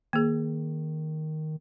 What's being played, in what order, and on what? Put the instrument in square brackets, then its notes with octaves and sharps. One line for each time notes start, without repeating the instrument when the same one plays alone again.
[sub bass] D#3 [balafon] A#3 G#4